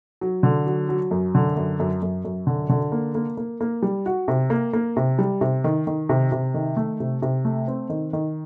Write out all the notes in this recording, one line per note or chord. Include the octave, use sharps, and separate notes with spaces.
F#3
D3
F#3
F#3
F#2
D3
F#2
F#2
F#2
F#2
D3
D3
A#3
A#3
A#3
A#3
G3
F#4
C3
A#3
A#3
C3
G3
C3
D#3
D#3
C3
C3
D#3
A3
C3
C3
A3
C4
D#3
D#3